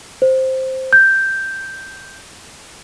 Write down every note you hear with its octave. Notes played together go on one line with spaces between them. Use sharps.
C5
G6